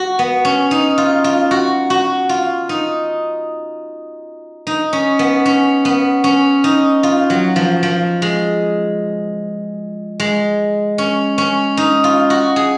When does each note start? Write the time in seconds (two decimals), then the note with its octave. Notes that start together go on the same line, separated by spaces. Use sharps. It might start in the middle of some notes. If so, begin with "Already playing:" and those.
Already playing: F#4
0.19 B3
0.45 C#4
0.71 D#4
0.98 F4
1.24 F4
1.51 F#4
1.90 F#4
2.29 F4
2.69 D#4
4.67 D#4
4.93 C#4
5.19 B3
5.45 C#4
5.85 B3
6.24 C#4
6.64 D#4
7.03 F4
7.30 F#3
7.56 F3
7.83 F3
8.22 G#3
10.20 G#3
10.98 C#4
11.38 C#4
11.77 D#4
12.04 F4
12.30 F#4
12.56 G#4